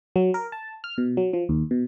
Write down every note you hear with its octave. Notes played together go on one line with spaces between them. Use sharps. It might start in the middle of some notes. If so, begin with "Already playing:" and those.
F#3
A#4
A5
F6
B2
F#3
F3
D#2
B2